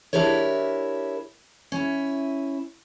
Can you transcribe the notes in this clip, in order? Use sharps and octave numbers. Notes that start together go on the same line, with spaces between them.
D4 E4 G4 A#4 C#5
C#4 E4